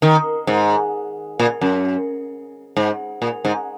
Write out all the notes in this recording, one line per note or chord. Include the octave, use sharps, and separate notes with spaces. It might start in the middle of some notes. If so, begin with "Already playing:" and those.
D#3
G#2
A#2
F#2
G#2
A#2
G#2